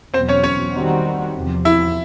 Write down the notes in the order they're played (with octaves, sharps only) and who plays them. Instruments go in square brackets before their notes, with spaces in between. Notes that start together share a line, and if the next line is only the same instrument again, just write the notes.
[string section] E2 B2 F#3 [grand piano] C4 C5
[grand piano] C#4 C#5
C#4 C#5
[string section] D#3 G3 C4 D#4 F#4
E2 C3 F3
[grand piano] E4 E5